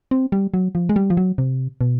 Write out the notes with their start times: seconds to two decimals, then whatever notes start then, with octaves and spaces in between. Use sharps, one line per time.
0.11 C4
0.32 G3
0.54 F#3
0.75 F3
0.89 G#3
0.96 G3
1.10 F3
1.17 F#3
1.38 C3
1.81 B2